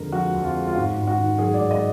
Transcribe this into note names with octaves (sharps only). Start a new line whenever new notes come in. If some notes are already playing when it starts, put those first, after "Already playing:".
Already playing: F2 D3 G#3 A#4
F3 F#4
F2
F4
G#3
F4
G#2 F#4
G#2
F#4
D#3
F#3 G#4
D5
G#2
D#5